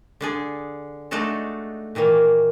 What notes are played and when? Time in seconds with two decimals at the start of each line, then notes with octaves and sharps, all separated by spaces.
0.21 D3 D4 G#4
1.11 G#3 A3 D4 D#4 F#4 A4
1.95 A#2 D#3 E3 A#3